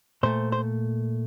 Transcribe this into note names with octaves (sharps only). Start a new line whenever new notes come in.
A#2 A3 C5
C5